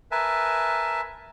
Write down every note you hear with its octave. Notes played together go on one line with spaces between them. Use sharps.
A#4 B4 E5 G#5 A5